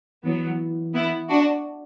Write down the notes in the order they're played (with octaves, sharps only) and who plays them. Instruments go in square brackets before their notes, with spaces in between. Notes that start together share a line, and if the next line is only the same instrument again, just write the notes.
[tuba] E3 [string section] F#3 B3
[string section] B3 E4
D4 F#4